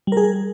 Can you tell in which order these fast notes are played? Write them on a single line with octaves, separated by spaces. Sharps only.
G3 A#4 G#4